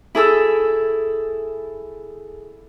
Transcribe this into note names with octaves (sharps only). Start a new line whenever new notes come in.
E4 G#4 A4 E6